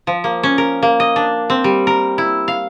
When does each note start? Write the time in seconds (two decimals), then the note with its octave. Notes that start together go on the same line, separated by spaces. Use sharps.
0.07 F3
0.24 A#3
0.43 C#4
0.58 A#4
0.83 A#3
1.00 D#5
1.16 D4
1.50 C4
1.64 G3
1.87 A#4
2.18 E4
2.48 F5